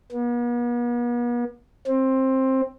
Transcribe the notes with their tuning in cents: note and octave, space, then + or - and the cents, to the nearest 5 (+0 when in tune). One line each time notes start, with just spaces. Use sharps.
B3 -45
C4 +15